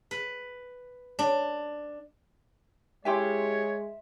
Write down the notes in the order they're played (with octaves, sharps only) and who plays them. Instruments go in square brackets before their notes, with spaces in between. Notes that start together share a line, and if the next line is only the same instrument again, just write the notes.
[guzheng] B4
D4
[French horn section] G#3 [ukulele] E4 G4 G#5 [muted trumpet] C#5 [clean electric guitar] E5 C6